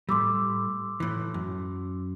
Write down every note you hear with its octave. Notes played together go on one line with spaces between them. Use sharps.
A2 G3 C6 D6 E6
A2 E3
F#2